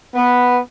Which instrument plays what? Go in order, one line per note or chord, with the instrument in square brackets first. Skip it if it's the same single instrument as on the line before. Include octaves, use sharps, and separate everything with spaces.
[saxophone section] B3